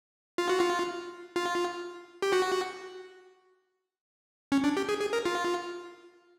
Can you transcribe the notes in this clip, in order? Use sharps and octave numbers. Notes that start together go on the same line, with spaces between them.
F4
F#4
F4
F4
G4
F#4
C#4
D4
G4
G#4
G#4
A#4
F4